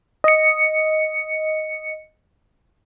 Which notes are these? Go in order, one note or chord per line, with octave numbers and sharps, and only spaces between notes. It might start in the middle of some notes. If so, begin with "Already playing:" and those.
D#5 C#7